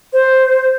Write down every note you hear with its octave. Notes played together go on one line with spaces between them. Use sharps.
C5